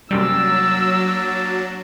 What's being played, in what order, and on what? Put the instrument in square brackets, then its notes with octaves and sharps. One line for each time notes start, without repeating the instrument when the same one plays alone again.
[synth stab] F#2 C3 G3 [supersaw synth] F#3 [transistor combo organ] A#3 D4 A5 [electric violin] E6